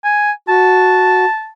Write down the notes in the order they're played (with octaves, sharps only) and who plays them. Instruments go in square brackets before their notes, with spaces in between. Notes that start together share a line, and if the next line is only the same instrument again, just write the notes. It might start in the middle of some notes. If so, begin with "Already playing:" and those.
[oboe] G#5
[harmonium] F#4 [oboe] A5